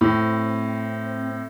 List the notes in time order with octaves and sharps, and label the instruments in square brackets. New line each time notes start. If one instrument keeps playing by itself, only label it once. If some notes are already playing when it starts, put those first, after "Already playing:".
[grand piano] A2 [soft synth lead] C4